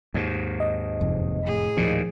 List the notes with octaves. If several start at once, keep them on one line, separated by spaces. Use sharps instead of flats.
D#2 G#2
D#5
F#1 F2 C3
A2 G#4
D#2 A#2 F3